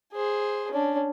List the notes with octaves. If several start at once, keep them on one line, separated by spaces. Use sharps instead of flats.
G#4 C5
C#4 D4